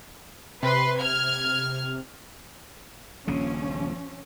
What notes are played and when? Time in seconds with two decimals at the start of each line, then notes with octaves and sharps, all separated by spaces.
0.63 C3 B4 C6
0.99 F6 G#6
3.27 D#1 A#1 C#3 F3 C#4